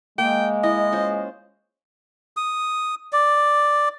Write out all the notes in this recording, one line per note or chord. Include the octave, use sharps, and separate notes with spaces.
G#3 A#3 G5
E4 D#5
C#4 F4 C5
D#6
D5